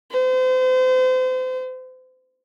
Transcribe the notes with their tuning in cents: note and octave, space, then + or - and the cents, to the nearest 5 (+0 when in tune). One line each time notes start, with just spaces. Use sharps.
C5 -35